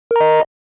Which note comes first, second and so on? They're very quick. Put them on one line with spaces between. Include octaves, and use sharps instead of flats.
A#4 A#5 D#5